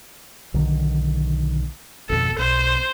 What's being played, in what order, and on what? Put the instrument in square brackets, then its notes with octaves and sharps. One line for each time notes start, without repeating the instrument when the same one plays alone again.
[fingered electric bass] B1 D3 D#3
[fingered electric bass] G#1 F2 B2 [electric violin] A4
[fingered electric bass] B1 [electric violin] C5